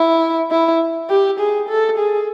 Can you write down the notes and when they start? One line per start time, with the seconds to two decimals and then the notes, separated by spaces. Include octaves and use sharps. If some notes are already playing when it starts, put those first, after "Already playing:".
Already playing: E4
0.51 E4
1.09 G4
1.39 G#4
1.69 A4
1.98 G#4